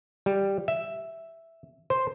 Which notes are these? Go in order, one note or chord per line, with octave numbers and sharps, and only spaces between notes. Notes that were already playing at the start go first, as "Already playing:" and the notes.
G3
E5
C5